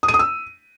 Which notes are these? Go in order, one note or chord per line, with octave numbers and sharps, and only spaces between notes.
D#6
D#7
D#6
E6